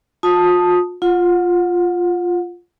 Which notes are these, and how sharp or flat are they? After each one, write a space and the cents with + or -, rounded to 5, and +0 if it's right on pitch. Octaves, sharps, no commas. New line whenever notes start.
F4 +40 A5 +0 D#6 +0
F4 +0 F#5 -25